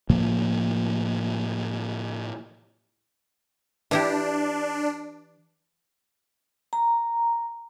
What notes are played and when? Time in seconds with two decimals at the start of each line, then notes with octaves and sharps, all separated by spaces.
0.10 A2 C3 F3 A#3
3.91 E3 D4 E4 G4
6.73 A#5